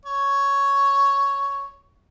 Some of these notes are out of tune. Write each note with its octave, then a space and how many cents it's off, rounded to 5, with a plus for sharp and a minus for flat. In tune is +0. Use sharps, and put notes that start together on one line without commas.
C#5 +5